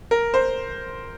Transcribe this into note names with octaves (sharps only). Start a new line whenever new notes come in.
A#4
C5